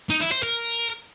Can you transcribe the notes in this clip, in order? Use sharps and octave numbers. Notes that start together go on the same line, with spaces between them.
D#4
E4
C5
A#4